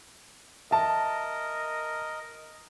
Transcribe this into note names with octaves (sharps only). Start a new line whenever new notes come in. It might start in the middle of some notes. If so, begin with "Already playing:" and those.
A#4 D#5 E5 A5